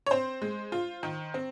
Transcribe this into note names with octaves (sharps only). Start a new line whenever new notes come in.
C#5
C4 C5
G#3
F4
D#3
C4